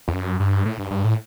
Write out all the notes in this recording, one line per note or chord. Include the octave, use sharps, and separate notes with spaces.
E2
F#2
G2
A2
G2
G2
A2